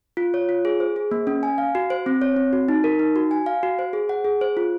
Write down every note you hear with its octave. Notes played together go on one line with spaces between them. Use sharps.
F4
C#5
F4
G#4
C5
G#4
A#3
C#4
G#5
F5
F#4
C5
C4
C#5
C4
F#4
D#4
A#4
D#4
F#4
G#5
F5
F#4
C5
G#4
F#5
G#4
C5
F4